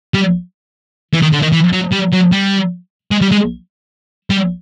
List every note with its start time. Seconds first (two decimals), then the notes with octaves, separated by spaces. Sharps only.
0.14 G3
1.13 E3
1.22 D#3
1.33 D3
1.42 D#3
1.53 E3
1.73 F#3
1.92 G3
2.13 F#3
2.32 G3
3.11 G#3
3.21 G3
3.32 G#3
4.30 G3